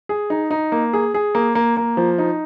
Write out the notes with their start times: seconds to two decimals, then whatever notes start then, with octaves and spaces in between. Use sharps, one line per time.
0.09 G#4
0.30 D#4
0.51 D#4
0.72 A#3
0.93 G#4
1.14 G#4
1.35 A#3
1.55 A#3
1.77 A#3
1.97 F3
2.18 D#4